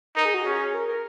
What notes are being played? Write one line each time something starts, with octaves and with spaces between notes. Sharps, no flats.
D#4 A#4
G#4
F#4
C#4 G#4
A#4
A#4